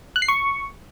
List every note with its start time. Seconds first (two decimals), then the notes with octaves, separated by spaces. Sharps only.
0.16 F#6
0.22 C7
0.28 C#6